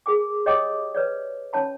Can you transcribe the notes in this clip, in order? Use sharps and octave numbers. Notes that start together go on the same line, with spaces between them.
G#4 A#4 G#5 D6
G4 C#5 D#5 G5 D6 D#6
B4 C#5 D5
C#4 C#5 A5 B5